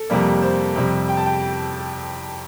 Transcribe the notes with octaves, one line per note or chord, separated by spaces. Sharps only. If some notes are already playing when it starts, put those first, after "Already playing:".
Already playing: A4
F2 C3 G3 A#3
C5
F2 C3 G3
G5
A5
G5